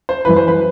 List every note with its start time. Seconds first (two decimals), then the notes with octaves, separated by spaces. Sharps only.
0.09 C5
0.25 F#2 E3 B4
0.37 C5
0.48 B4